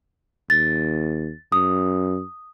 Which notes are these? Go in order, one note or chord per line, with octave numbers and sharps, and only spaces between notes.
D#2 A6
F#2 D#6